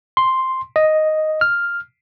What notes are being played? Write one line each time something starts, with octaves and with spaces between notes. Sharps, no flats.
C6
D#5
F6